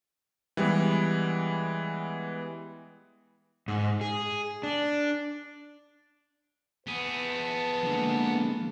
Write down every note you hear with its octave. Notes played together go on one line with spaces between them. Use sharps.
E3 G3 G#3 B3
G#2
G#4
D4
B3 G#4 B4 A5
D3 F3 G#3 A#3